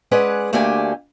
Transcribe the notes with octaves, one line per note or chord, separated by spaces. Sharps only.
G#3 C#4 G#4 B4 D5 F#5
D2 A3 A#3 D4 G4 G#5